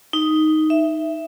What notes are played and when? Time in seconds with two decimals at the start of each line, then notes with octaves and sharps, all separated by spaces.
0.13 D#4
0.70 E5